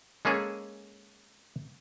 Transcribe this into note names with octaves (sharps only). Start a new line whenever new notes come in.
G#3 A#3 C#4 G#4 A4